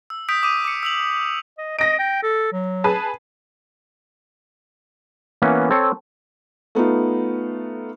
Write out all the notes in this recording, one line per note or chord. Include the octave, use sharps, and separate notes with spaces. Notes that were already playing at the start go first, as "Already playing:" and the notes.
E6
D#6 G6 B6 D7
D6 D#6 D#7
D6 C#7
E6 F7 F#7
D#5
D#5 A#6 D7
G5
A4
F#3
G#4 B4 A5
E3 A#3 B3 C#4
C4 A4 C#5
A3 B3 D#4 F4